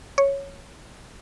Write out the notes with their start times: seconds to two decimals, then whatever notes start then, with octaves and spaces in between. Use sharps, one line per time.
0.18 C#5